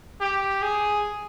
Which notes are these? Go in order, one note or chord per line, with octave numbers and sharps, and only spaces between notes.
G4
G#4